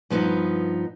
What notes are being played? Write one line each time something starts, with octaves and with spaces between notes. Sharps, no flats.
G2 F3 B3 D4 D#4